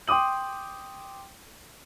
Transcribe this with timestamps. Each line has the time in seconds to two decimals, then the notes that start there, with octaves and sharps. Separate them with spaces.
0.08 G5 C6 D6 D#6 F#7